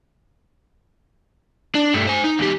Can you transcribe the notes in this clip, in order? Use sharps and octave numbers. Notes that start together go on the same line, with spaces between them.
D4
G2 A3
C5 G#5
D#4
E2 G4